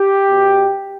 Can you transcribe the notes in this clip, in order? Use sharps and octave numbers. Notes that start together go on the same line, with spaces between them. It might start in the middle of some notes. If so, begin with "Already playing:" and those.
Already playing: G4
B2